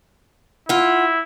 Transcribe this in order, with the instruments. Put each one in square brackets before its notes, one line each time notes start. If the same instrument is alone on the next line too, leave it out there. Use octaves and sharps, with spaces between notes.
[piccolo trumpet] E4 [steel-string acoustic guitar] F4 F#5